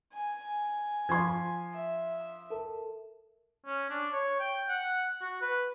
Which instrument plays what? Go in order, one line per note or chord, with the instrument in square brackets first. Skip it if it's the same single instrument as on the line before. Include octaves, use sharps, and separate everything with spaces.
[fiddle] G#5
[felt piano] F3 C6 [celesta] G#6
[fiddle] E5
[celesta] A4 A#4 A5
[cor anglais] C#4
D4
C#5
G5
F#5
F#4
B4